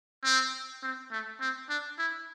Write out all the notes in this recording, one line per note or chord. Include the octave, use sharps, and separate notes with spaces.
C4
C4
A3
C4
D4
E4